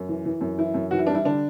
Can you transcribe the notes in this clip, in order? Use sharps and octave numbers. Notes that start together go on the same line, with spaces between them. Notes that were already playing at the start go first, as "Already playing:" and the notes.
Already playing: F#2
E3
E3
F#2
E3 E4
F#2
E3 F#4
E4
G3 D4
E4
D3 D4